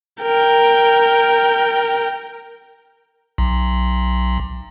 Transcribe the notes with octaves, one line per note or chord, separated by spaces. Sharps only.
A#4 G5
B1